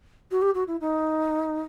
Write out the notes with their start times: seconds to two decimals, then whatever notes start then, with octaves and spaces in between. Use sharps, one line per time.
0.31 F#4
0.42 G4
0.55 F#4
0.68 E4
0.81 D#4